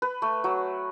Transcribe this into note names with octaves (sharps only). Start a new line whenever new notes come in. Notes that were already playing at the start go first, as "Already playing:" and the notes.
B4
A3
F#3